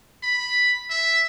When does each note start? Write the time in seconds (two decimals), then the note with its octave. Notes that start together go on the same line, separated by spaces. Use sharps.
0.23 B5
0.90 E5